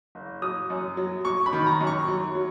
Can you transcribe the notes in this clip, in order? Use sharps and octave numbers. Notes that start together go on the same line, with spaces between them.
F#1
F#3 D#6
F#2
F#3
F#3 C#6
B5
D#3
A#5
F#2
C#6
F#3
F#3